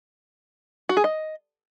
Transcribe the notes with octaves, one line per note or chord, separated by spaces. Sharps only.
F#4
G#4
D#5